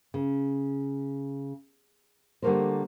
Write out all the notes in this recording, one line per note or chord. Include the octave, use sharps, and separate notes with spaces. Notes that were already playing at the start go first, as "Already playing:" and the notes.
C#3
D3 G3 A3 A#3 A#4 C5